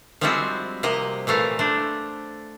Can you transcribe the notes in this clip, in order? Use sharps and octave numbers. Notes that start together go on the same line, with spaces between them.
F3 G3 G#3 C4 E4 F#4
C3 A#3 D#5
A#2 E3 A3 F5
A3 D4 C5